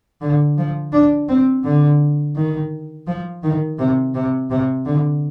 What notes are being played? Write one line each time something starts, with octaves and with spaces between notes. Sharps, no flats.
D3
F3
D4
C4
D3
D#3
F3
D#3
C3
C3
C3
D3